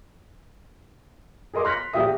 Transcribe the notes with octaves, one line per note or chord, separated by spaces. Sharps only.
G#4 A#4 D#5 C6 D6
C6 F6 F#6 A#6 B6 C#7
A#1 E3 G4 E5 D#6